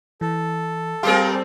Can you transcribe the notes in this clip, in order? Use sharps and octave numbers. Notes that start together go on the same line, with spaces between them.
E3 A4
G3 C4 G4 G#4 A#4 F5 C6